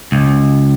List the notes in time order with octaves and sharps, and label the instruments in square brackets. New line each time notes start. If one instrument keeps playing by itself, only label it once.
[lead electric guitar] C#2